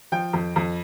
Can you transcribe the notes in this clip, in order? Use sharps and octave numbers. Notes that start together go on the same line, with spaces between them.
F3 G5
F2
F2